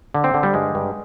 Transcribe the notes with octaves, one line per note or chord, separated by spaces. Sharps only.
D3
C4
D3
G3
G2 G#3
G2